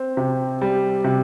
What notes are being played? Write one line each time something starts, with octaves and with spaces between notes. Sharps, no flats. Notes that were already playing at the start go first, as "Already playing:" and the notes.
Already playing: C4
C3
G3
C3